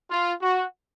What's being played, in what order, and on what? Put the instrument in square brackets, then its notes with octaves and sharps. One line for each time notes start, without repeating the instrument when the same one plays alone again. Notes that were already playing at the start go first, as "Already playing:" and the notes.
[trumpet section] F4
F#4